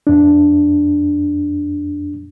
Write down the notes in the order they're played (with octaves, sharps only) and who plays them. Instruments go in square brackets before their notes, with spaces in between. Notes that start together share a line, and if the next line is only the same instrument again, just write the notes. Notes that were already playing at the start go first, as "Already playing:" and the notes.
[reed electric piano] F2 D4